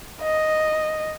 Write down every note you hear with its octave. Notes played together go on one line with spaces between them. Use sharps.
D#5